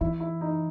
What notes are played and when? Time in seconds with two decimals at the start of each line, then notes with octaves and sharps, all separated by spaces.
0.01 E3 E4
0.20 E4
0.41 D#4